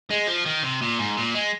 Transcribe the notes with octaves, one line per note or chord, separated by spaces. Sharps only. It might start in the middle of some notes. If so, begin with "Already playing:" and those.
G#3
F3
D#3
C3
A#2
G#2
A#2
G#3